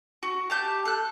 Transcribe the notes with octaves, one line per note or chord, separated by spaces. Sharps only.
F#4
G4 A5 G6
A4 F#6